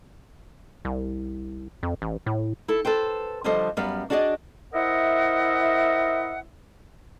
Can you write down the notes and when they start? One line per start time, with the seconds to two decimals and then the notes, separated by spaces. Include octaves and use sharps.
0.85 C2
1.83 F2
2.02 A1
2.26 A2
2.68 E4 A4
2.85 A4 B4 C5 G5
3.44 D3 F3 G3 A4 C5 D#5
3.77 F#2 G3 B3 F5
4.10 D4 F#4 G#4 D5 D#5
4.73 E4 A#4 C5 D#5 E5 F#5